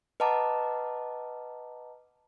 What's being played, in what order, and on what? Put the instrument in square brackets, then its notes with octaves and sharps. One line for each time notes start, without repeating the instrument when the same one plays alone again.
[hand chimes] B4 D#5 F#5 A5 A#5 D6